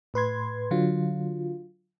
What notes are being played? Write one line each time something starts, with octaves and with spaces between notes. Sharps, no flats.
A2 B4 C6 G#6
D3 F#3 F4